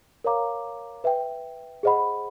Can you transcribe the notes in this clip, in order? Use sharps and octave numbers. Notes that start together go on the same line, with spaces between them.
A#4 C#5 F5 A#5 D6
B4 E5 G5
G#4 C5 D#5 F#5 B5